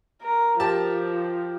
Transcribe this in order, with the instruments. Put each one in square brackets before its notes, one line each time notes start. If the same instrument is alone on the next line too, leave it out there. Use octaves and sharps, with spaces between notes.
[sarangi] A#4
[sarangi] F3 [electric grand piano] G4 A#4 [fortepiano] A5